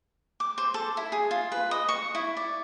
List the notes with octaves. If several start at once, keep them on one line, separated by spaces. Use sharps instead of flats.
D6
C5
A4
E4
G#4
F4
B4
D#5
C#6
E4
D5